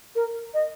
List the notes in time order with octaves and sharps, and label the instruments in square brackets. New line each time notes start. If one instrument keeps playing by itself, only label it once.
[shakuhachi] A#4
D#5